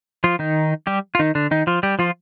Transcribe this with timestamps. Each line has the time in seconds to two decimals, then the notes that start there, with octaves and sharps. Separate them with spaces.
0.24 F3 F4
0.39 D#3 D#4
0.87 G3 G4
1.15 F4
1.19 D#3 D#4
1.35 D3 D4
1.51 D#3 D#4
1.67 F3 F4
1.83 G3 G4
1.99 F3 F4